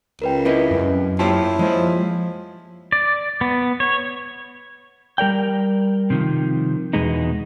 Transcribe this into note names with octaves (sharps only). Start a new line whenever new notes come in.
C#2 A#4 B4 G5
C4 E4 B4 D#5
F#2
A#3 E4 F4 G4 C5 C#5 A5
F3 G#3
D5
B3
C#5
G3 A#4 D5 G5
C3 D#3 F3
E2 B2 G#3 B3 D#4